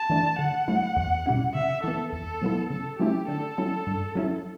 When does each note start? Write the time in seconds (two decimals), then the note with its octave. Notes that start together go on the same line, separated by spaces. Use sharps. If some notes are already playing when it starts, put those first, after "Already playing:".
Already playing: A5
0.10 E3 A3 D4
0.39 D3 F#5
0.68 F#3 A3 E4
0.96 E2
1.26 B2 G3 C#4 E4
1.54 C#3 E5
1.84 E3 B3 A4
2.12 E2 A4
2.42 B2 F#3 B3 E4
2.70 C#3 A4
2.99 F#3 A3 C#4 E4 G4
3.28 D3 A4
3.58 F#3 C#4 E4
3.87 G2
4.15 F#3 C#4 E4